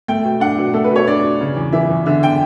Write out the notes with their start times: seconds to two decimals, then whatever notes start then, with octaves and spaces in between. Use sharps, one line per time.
0.08 A3 G5
0.24 B2
0.40 D4 F#5
0.58 B2
0.74 A3 A4
0.84 B4
0.91 B2 C#5
1.07 D4 D5
1.23 B2
1.40 C#3
1.56 E2
1.73 E3 E5
1.90 E2
2.06 D3 E5
2.23 G5